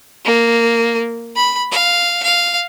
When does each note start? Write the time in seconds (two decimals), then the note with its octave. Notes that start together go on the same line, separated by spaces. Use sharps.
0.25 A#3
1.36 B5
1.72 F5
2.23 F5